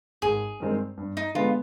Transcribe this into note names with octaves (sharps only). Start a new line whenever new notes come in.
G#1 G#4
G2 D#3 G#3 C4
G2
D#4
D3 G#3 B3 F4